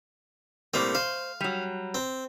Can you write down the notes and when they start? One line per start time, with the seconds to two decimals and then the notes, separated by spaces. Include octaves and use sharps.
0.74 A2 G3 A#3 C4
0.95 C5 F5
1.40 F#3 G3
1.94 C4